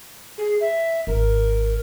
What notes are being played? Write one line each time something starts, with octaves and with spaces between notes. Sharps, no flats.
G#4
E5
G#1 A#4